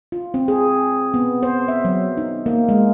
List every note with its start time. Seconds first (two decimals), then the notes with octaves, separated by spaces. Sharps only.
0.12 F4
0.34 C4
0.48 G#4
1.14 B3
1.43 C5
1.68 E5
1.85 F#3
2.17 D#4
2.46 A#3
2.69 G#3